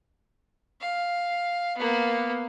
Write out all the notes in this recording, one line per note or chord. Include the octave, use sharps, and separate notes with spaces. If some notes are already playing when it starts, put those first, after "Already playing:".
F5
A#3 B3